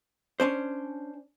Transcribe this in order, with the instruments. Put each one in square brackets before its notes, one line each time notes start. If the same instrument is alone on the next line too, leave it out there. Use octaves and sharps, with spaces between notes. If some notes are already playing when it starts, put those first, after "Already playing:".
[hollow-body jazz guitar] C#4 D4 C5